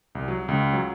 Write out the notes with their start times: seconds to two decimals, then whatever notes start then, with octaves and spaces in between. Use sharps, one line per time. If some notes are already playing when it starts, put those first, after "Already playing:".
0.15 C2
0.28 F#3
0.48 C#2
0.73 F#3